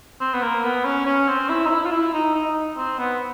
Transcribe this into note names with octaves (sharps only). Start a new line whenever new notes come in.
C4
B3
A#3
B3
C#4
C#4
C4
E4
D#4
E4
F4
E4
D#4
D#4
C4
B3